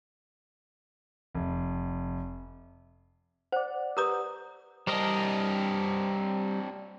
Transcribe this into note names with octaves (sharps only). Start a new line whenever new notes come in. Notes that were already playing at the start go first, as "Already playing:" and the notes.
F1
C5 D5 F#5
G4 A#4 B4 A#5 D#6
G3 C4 D4 A#4 D#5